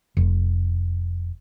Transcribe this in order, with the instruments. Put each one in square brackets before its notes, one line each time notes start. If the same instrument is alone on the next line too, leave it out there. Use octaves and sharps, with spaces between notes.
[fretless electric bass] F1